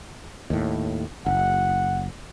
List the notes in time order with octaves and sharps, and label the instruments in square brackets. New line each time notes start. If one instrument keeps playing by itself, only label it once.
[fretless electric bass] D#2 A2
[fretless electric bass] F#1 [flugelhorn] F#5